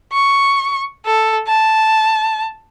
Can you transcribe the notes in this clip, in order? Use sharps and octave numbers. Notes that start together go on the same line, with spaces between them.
C#6
A4
A5